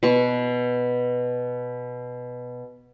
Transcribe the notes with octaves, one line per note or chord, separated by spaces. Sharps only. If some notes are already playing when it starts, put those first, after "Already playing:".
B2 C#6